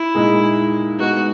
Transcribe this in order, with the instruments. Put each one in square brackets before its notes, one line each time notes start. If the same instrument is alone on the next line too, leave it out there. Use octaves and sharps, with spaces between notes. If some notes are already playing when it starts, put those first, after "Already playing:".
Already playing: [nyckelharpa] E4
[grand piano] A#2 G#3 D#4 G#4
[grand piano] G#3 B3 D#4 [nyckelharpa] F#4